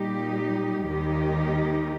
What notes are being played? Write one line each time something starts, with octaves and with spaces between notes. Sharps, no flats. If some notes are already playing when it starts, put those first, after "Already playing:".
Already playing: A#2 G3 D#4 G4
D#2 D#3 G3 D#4 G4